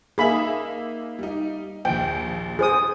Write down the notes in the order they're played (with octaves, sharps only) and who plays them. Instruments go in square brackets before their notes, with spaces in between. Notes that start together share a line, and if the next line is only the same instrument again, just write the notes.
[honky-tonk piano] A#3 D#4 E5 [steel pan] G#4 B5
[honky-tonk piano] G3 D#4
[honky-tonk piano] A#1 D#2 [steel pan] G5
[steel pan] G#4 C5 D#6